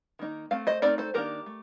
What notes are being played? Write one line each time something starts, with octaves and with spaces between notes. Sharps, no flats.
D#3 A#3 D#4
A3 C4 F5
C5 D#5
A3 C4 D#4 A#4 D5
A4 C5
D#3 A#3 D4 G4 A#4
A3